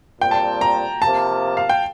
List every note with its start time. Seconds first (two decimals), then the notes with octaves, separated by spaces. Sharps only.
0.20 A#2 G3 C4 G5
0.31 A5
0.61 A#5
1.01 C3 F3 A#3 A5
1.57 F5
1.69 G5